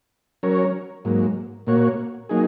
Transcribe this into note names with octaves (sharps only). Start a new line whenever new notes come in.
F#3 C#4 A#4 C#5
G#2 F#3 A#3
A#2 A#3 F#4 C#5
F#3 A#3 D#4 G#4